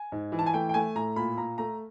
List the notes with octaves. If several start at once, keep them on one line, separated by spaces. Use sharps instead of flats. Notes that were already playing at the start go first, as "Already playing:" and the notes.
Already playing: G#5
G#2
E3
A5
G#5
A3 G5
G5
A3 G#5
A2 A#5
A#2 B5
A#2 A#5
A3 A#5